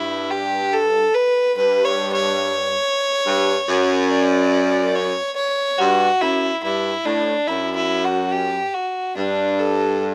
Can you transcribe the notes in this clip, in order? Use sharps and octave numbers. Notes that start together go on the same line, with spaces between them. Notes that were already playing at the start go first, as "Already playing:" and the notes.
Already playing: G2 E4
G4
A4
B4
G2 B4
C#5
C#5
G2
F#2
D5
C#5
C#5
G2 F#4
F#2 E4
G2 E4
A2 D4
F#2 E4
E4
F#4
G4
F#4
G2 D4
A4